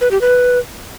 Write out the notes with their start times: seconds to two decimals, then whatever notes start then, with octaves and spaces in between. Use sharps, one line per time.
0.01 B4
0.11 G4
0.21 B4